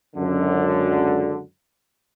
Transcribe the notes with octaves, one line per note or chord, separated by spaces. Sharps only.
C#2 F#2 D3